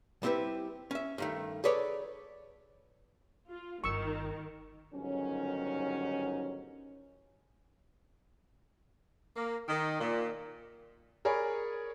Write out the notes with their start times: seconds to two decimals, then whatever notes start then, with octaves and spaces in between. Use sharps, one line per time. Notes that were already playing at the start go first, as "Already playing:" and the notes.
0.23 G3 C4 E4 G4 B4
0.91 C#4 E5
1.18 G2 D#3 A3
1.64 G#4 A4 B4 C#5 D5
3.50 F4
3.84 G1 D#3 F4 C#6 E6
4.94 G1 G#2 D#3 F#3 C#4
9.36 A#3
9.68 D#3
10.00 A#2
11.25 G#4 A#4 C#5 D5 G#5 B5